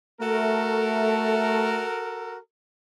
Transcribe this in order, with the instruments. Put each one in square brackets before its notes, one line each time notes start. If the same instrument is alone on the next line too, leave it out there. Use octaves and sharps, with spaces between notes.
[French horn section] A3 [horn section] F#4 A4 A#4